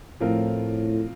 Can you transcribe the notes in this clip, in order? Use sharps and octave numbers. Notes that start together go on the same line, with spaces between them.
A2 F3 C4 F4 A#4